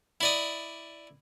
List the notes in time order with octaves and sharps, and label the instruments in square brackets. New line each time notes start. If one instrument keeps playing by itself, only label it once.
[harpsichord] E4 D5 D#5